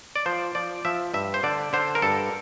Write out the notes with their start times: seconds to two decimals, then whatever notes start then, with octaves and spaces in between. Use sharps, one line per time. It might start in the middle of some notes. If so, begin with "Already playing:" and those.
0.16 D5
0.26 F3 C5
0.55 F3 D5
0.85 F3 E5
1.14 G2 E5
1.34 C5
1.43 D3 D5
1.73 D3 C5
1.95 A#4
2.02 G2 A4